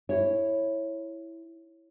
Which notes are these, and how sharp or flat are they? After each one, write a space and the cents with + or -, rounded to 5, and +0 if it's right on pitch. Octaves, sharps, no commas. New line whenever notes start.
E4 +0 C#5 -10